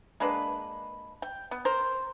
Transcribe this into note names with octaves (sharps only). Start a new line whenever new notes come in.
G#3 A#3 D4 B4
G5
B3
A#4 C5